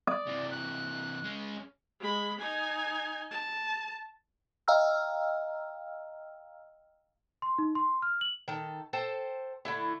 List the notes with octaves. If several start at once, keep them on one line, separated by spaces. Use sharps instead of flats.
D5 D#6
C3 E3
F#6
G#3 C#4
G#3 B5
D#4 G#5
A5
D#5 F5 G5 A#5 E6 F6
C6
D#4
C6
F6
F#7
D#3 A4
A4 C5 G5 A5
D3 A3 E4